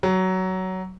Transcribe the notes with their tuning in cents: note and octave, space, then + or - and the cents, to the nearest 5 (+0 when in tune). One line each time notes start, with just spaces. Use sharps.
F#3 +15